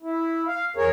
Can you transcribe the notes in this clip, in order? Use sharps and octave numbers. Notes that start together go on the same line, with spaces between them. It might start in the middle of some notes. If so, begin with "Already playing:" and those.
E4
F5
E2 G#4 A#4 C#5